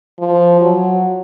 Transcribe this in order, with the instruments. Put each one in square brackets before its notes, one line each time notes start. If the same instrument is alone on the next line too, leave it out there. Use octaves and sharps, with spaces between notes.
[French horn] F3
F#3